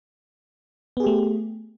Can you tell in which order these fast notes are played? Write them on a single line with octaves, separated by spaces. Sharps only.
B3 G#4 G4 A3